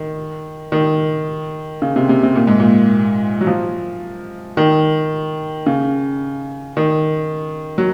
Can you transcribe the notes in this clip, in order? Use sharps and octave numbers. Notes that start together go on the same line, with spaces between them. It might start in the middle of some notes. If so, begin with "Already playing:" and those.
Already playing: D#3
D#3
C#3
C3
C3
C3
A#2
G#2
A#2
F#3
F3
D#3
C#3
D#3
F#3